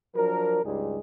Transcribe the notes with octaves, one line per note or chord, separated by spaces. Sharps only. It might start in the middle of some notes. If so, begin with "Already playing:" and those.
F3 F#3 D4 A#4
C#2 G2 G3 G#3 D#4 G#4